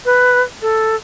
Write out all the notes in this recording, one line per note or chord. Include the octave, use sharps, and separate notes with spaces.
B4
A4